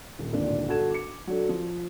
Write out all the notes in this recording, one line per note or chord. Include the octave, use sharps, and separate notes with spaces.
D#1
D1 G#1 A#2 D4
G1 F#4 A4 A5 G#6 E7
D6 C#7
F#3 D4 A4
F3